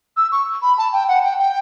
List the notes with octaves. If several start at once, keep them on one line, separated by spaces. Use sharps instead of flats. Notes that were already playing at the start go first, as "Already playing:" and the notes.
E6
C#6
B5
A5
G5
F#5
G5
G5